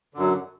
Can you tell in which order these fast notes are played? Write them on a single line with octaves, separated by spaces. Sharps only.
D3 F#2 F#3